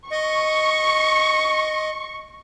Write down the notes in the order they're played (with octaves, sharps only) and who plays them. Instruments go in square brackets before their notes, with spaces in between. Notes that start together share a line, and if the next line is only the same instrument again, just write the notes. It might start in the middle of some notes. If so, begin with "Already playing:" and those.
[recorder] D#5 [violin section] C#6